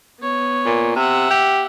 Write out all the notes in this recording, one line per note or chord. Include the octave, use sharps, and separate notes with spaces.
B3 C#5
A#2
C3 E5 F#5
G4